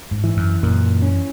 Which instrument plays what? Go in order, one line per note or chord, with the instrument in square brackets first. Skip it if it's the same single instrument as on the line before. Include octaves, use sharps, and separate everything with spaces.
[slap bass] G#2
[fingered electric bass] E3
[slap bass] F#2
[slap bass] F#2 [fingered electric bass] A#2
[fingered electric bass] C#4